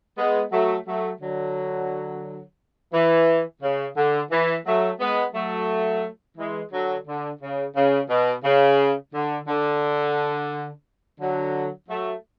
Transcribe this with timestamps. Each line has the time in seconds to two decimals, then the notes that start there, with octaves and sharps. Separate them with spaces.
0.18 G#3 B3
0.52 F#3 A3
0.87 F#3 A3
1.21 D3 F#3
2.94 E3
3.62 C#3
3.97 D3
4.31 E3
4.66 F#3 A3
5.00 G#3 B3
5.34 F#3 A3
6.38 E3 G#3
6.72 D3 F#3
7.07 D3
7.42 C#3
7.76 C#3
8.10 B2
8.44 C#3
9.14 D3
9.48 D3
11.20 D3 F#3
11.89 F#3 A3